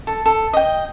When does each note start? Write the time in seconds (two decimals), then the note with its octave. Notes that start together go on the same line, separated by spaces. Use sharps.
0.07 A4
0.26 A4
0.53 D#5 G5